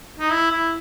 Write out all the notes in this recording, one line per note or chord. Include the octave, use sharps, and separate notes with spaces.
D#4
E4
E4